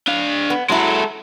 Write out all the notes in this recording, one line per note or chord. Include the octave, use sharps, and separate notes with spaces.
D4 F5
B3
F#3 G#3 E4 A4